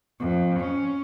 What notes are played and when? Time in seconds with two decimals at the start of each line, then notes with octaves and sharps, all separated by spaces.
0.20 F2
0.60 C#4